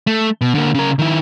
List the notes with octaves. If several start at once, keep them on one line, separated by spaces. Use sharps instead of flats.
A3
B2
D3 A#3
C#3 A#4
D#3 E4